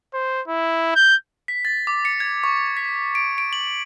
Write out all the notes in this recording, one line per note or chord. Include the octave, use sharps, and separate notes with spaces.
C5
E4
G6
B6
A6
D6
C#7
G#6
C#6
B6
D7
D7
F#7